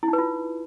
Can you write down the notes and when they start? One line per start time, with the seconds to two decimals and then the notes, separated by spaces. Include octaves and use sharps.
0.03 E4
0.08 D#4
0.13 B4
0.18 F4